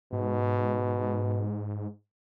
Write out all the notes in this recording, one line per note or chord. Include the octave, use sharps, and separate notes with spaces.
G#2 B2